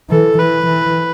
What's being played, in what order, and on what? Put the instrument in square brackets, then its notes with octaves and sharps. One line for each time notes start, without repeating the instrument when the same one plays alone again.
[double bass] E3 [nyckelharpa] A4
[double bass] E3 [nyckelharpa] B4
[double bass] E3